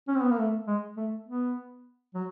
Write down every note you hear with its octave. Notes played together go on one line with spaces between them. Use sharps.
C#4
C4
B3
A#3
A3
G#3
A3
B3
F#3